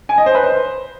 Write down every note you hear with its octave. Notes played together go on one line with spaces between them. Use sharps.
G#5
D#5
C5
B4
C5